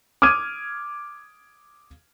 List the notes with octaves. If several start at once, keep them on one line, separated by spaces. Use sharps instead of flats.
D6 D#6 F6 G#6 D#7